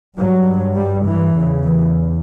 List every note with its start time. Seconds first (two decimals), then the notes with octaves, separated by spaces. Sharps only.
0.18 G2 F#3
0.77 G3
1.06 E3
1.34 E2 C#3
1.63 E3